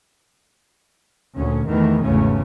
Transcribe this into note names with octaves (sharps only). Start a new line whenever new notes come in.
D2 A#2 C#4
E2 D#3 E3 A3
G#1 E2 C#3 A3 C#4